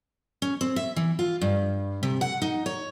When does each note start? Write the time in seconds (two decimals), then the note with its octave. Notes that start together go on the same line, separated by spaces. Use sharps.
0.42 C#4
0.61 C4
0.76 E5
0.96 E3
1.19 F4
1.42 G2
2.03 C3
2.21 F#5
2.42 D#4
2.66 C#5